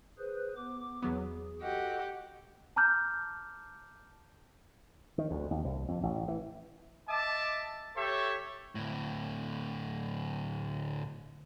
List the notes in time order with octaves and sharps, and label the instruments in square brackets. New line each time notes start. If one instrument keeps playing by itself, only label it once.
[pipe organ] G#4 B4 C5
B3 D6
[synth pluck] E2 F#3 B3 [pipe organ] G#4
[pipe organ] F#4 A4 D#5 [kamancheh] G4 F#5
[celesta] A5 A#5 D6 F6 G6
[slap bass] D#3
D2
D#2
C2
F2
A1
E3
[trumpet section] D#5 E5 A5 D6
G4 A4 C#5 E5
[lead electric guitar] D2 A2